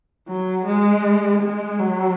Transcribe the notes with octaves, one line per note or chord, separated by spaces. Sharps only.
F#3
G#3
G#3
F#3